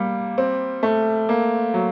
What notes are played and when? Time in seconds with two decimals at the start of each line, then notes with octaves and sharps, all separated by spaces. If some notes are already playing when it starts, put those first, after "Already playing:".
Already playing: G3 A#3
0.38 C4
0.83 A3
1.29 A#3
1.74 F#3